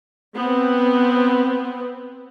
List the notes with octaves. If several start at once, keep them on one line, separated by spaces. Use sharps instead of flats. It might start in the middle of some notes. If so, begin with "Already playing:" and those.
B3 C4